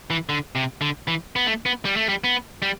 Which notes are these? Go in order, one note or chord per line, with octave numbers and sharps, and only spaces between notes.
E3
D3
C3
D3
E3
B3
A3
B3
G3
A3
G3
B3
G3